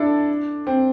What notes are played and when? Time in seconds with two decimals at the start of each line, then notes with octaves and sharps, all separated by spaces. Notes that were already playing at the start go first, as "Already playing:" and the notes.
Already playing: D4 E4 A4
0.67 C4